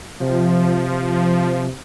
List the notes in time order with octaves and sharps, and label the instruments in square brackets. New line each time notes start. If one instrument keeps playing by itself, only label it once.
[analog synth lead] C3 [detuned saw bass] F3